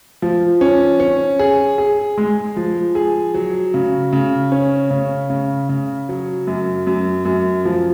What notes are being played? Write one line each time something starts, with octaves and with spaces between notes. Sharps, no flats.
F3
C#4
C#4
G#4
G#4
G#3
F3
G#4
F#3
C#3
C#3
C#4
C#3
C#3
C#3
F#3
F#2
F#2
F#2
F3